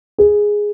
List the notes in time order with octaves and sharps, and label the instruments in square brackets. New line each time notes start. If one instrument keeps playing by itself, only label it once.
[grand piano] G#4